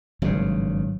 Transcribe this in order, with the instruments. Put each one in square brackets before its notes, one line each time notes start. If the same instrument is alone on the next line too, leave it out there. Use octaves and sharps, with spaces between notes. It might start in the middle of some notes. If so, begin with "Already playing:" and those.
[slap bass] G#1 G2 C#3 [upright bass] F#3